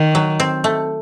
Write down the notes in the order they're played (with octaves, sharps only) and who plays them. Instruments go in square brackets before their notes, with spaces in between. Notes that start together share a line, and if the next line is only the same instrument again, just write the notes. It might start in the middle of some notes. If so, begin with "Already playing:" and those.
Already playing: [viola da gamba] D#3
[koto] F#3
C4
A3